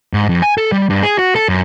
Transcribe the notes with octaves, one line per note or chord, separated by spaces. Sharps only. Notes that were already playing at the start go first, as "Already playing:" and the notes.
G#2
F2
G#5
A4
G3
G2
G#4
F#4
A4
F#2